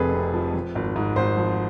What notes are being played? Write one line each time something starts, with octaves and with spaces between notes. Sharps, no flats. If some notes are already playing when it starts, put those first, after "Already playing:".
Already playing: F1 F2 C3 F3 G#4 A4 B4
C3
F3
F3
G#1
G#2
G#1 C5
F3